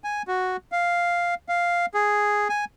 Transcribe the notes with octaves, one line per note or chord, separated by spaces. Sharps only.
G#5
F#4
F5
F5
G#4
G#5